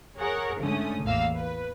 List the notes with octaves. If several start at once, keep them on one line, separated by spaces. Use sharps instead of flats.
G#4 A#4 C#5 F#5
G#2 D3 A3 C#4 D#6
A1 E2 A#3 F5 E6
B4